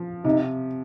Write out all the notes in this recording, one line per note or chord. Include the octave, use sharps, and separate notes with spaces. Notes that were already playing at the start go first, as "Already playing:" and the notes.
Already playing: F3
C3 D#4